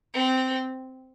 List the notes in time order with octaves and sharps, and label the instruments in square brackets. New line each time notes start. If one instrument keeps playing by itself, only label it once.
[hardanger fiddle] C4